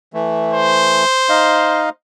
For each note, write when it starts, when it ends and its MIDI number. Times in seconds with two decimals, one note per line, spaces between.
0.14 1.04 52
0.14 1.04 57
0.54 1.92 72
1.29 1.89 63
1.29 1.89 75
1.29 1.89 77